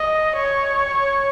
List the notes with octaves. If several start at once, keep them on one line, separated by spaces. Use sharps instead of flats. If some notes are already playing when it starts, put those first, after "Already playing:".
Already playing: D#5
C#5